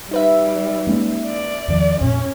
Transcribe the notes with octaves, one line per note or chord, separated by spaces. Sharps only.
G3 D#4 B4 E5
G#3 A#3 C#4
D5
E2 D#3 F3
F2 A#2 C#4